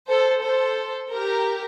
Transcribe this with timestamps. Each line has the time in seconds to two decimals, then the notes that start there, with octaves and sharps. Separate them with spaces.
0.08 A4 C5
0.43 A4 C5
1.12 G4 A#4